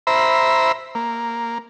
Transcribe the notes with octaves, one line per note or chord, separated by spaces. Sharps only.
C5 E5 A#5 B5
A#3